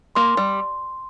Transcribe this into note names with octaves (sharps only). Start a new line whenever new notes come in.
A#3 C6
G3